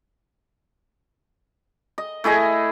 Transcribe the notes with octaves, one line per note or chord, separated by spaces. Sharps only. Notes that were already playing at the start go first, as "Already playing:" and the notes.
D#5
A3 E4 G#4 D#5